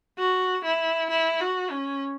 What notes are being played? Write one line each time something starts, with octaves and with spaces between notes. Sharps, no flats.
F#4
E4
E4
F#4
C#4